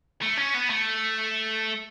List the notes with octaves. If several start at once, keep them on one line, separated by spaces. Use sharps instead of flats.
A3
C#4
B3
A3